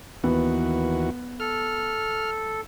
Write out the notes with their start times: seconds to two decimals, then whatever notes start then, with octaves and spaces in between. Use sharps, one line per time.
0.24 D#2 E3 B3 F#4
1.40 A4 F6